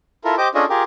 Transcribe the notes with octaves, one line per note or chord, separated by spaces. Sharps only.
E4 F4 A4 A#4
G4 C5 D#5 D6
C#4 D4 F4 G#4 A4 D#5
F4 G4 G#4 A#4